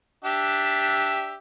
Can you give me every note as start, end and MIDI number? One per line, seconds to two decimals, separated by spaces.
0.24 1.37 62
0.24 1.37 67
0.24 1.37 76